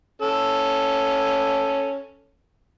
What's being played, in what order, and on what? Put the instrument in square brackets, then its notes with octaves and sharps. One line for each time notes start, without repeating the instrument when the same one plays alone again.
[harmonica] C#4 A4